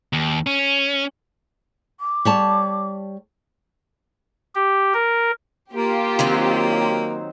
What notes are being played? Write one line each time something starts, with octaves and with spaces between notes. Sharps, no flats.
D#2
C#4
D6
G3 C#5 A5
G4
A#4
A#3 F4 G4
D#3 F#3 C4